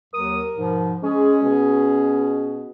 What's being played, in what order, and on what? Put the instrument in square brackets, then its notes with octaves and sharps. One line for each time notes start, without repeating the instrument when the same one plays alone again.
[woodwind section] D#2 F#3 D#6 [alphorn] A#4
[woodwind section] G#2 B2 F3
[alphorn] G#3 [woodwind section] C#4 G#4
[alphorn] B2